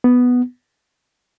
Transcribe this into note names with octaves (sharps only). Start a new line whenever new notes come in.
B3